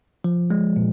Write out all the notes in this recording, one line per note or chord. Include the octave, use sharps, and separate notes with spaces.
F3
G#3
A#2